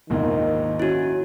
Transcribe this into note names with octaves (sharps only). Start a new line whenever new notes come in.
A#1 D#2 G#2 D#3
C#4 E4 F#4